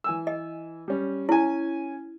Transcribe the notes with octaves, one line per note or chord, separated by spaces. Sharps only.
E3 G#5 E6
D#5
G3 C#4
C#4 E4 G#5